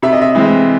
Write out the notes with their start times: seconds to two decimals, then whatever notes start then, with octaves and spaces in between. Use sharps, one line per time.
0.02 C3 E5
0.12 D#5
0.22 E5
0.35 E3 G#3 C4